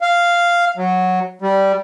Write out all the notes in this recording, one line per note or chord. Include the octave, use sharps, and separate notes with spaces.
F5
F#3
G3